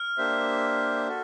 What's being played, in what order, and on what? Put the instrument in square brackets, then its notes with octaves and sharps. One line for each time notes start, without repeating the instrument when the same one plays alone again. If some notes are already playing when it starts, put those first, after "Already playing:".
Already playing: [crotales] F6
[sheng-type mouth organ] A#3 D4 G4 C5 E5
F#4 A4